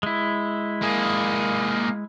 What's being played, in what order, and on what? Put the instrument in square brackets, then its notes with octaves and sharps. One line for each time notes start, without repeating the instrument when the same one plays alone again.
[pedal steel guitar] G#3 E4
[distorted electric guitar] A#3 G#4